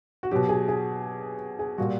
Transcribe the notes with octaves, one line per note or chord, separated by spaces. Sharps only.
F#4
B2 F#3 G4
G#4
G#4
G#4
A#2 G3 F#4